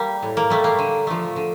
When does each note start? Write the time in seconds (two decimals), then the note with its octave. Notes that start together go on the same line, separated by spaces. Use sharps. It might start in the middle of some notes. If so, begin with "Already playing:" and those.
Already playing: G3 A#3
0.22 A2
0.37 A#3
0.50 G3 A3
0.64 A#3
0.79 D3
1.07 F3 A3
1.36 D3